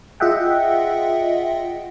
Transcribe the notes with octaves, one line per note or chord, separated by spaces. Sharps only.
F4 G#4 D#5 E5 F#5 G5